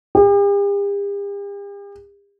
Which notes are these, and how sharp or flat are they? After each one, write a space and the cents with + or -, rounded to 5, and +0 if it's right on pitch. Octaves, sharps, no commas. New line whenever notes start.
G4 +45